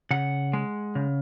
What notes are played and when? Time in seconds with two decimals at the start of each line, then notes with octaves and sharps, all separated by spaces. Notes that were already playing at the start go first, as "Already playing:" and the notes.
0.11 C#3 F#5
0.53 G#3
0.95 C#3